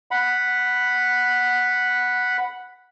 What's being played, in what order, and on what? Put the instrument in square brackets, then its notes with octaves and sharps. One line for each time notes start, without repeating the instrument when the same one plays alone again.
[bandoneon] F#5 B5